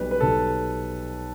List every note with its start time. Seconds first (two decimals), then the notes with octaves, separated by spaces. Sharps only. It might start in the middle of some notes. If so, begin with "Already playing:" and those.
Already playing: B1 B2 G3 B4
0.11 B4
0.20 B1 B2 G3 A4